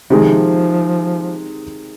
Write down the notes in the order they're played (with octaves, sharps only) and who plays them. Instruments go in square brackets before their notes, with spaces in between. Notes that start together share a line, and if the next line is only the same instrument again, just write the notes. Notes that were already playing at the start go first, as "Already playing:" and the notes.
[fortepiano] C3 D#3 G#3 [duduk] F3